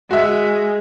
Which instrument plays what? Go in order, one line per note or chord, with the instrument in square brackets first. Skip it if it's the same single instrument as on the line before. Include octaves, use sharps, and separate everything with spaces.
[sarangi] G#3 [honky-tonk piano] F#4 E5